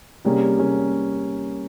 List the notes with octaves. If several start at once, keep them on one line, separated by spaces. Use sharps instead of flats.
C3 G3 A#3 C#4 G#4
C3 G3 A#3 C#4 G#4